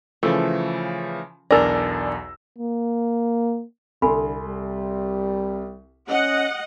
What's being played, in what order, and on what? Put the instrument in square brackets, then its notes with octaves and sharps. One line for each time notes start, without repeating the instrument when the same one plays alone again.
[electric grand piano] C#3 E3 F3 [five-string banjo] A3
[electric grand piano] B1 E2 A#6 [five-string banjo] D4 A#4 [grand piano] D5 G#5 E6
[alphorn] A#3
[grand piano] C2 C6 [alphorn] D3 [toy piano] A4 G#5 B5
[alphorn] G3
[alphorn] C#4 [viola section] D#5 F#5